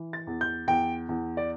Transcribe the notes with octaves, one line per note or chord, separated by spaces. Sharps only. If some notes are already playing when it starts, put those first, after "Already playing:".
Already playing: E3
A6
E2
G6
E2 G5
E2
D5